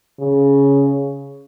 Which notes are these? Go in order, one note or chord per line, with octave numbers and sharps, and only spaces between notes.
C#3